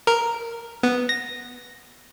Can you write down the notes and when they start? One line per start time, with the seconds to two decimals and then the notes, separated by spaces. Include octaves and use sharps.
0.07 A#4
0.83 B3
1.09 A#6